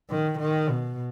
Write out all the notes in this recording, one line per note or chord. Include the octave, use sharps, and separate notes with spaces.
D#3
D#3
B2